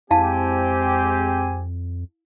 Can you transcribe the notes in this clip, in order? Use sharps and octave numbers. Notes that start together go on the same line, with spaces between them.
F2 G#3 C4 E4 G4 F5 G#5 A5